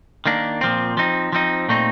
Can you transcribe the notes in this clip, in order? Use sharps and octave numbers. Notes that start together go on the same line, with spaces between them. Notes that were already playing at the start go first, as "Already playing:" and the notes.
D#3 A#3 D4
A#2 F3 C4
F3 C4 D#4
F3 C4 D#4
A#2 A3 C4 D#4